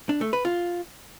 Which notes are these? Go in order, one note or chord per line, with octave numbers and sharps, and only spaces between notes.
D4
A3
B4
F4